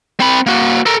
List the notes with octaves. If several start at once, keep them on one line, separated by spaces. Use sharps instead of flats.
C4 B5
A#3 F#4
A4 A#4